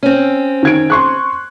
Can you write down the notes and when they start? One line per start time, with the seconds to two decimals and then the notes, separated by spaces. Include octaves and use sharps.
0.03 C4 C#4
0.63 D#3 G#6 D7
0.90 C6 C#6 F#6